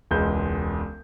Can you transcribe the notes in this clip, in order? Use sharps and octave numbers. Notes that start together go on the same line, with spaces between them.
E1 C#2 G#3 G6